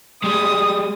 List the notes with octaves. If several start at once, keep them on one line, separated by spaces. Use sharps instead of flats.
G3 G#3 D#6